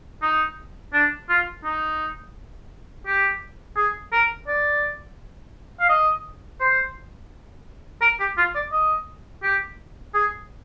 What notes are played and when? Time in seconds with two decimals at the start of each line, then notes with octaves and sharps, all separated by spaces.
0.22 D#4
0.93 D4
1.29 F4
1.64 D#4
3.06 G4
3.76 G#4
4.12 A#4
4.47 D5
5.80 F5
5.89 D#5
6.60 C5
8.01 A#4
8.20 G4
8.37 F4
8.55 D5
8.72 D#5
9.43 G4
10.14 G#4